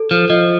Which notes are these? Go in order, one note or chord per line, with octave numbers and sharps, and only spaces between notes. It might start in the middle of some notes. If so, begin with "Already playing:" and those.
Already playing: A4
F3
F3 D#5